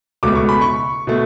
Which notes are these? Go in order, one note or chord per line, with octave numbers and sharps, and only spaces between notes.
C#2 B2 A3 D6
C#6
B5
C#6
B2 A3